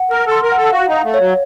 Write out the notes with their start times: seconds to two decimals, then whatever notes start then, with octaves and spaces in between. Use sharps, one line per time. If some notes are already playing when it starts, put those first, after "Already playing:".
Already playing: F#5
0.11 A#4 F6
0.27 A4 C6
0.42 A#4
0.52 A4 F#5
0.72 F#4 F5
0.88 D#4
0.93 F5
1.04 A3
1.14 C#5
1.20 F#3